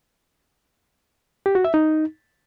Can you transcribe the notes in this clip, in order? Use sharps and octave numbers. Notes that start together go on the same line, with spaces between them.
G4
F#4
E5
D#4